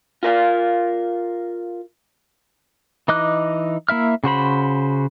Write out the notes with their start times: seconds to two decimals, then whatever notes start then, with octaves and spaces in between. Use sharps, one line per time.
0.23 F4 A#4 F5
3.08 E3 D#4 D#5 D6 F#6
3.89 A#3 E4 E5 F6
4.24 C#3 F#4 C5 B5